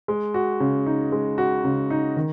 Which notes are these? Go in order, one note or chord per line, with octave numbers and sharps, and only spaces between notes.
G#3
F#4
C#3
D#4
G#3
F#4
C#3
D#4
D#3